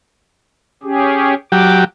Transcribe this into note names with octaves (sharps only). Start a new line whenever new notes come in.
C#4 G4 G#4
F#3 G4 D6